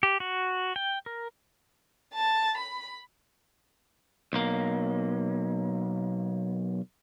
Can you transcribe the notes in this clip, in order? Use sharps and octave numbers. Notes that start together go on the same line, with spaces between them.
G4
F#4
G5
A#4
A5
B5
B1 A#3